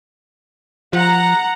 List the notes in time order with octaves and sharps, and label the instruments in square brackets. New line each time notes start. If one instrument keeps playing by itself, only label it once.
[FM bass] F3 [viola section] F#5 A#5